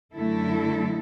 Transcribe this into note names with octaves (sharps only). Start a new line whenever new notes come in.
F#2 D3 A3 E4 A4